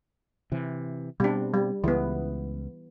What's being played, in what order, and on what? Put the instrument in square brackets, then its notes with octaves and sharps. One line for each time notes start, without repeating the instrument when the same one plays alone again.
[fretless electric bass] C3 E3
[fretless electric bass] B2 B3 C4 [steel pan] G3 D4
[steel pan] G3
[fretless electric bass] C#2 [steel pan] E3 B3